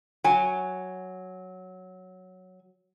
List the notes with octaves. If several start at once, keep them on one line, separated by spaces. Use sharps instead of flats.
F#3 G#5